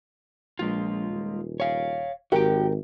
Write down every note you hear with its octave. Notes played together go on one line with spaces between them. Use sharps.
A#1 G#3 F4
D#1
C#5 F5
G#1 F#4 G4 A#4 G5